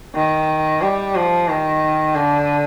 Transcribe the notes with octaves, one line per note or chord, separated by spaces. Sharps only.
D#3
G3
F3
D#3
D3